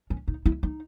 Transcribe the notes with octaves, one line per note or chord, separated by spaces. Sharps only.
C#4
D#4
E4
D#4